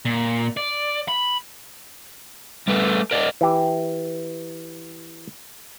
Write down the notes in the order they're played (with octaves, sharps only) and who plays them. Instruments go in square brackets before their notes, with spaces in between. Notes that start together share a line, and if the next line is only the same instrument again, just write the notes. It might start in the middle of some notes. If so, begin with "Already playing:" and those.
[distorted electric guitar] A#2
D5
B5
[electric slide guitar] G3 A3 B4
A#4 D5 D#5
[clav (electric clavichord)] E3 G4